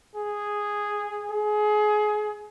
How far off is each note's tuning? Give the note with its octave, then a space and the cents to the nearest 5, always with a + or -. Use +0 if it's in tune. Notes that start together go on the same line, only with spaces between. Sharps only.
G#4 -5
G#4 +25